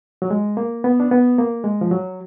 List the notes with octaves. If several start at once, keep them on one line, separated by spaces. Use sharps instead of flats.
F#3
G#3
A#3
B3
D4
B3
A#3
G#3
F3
F#3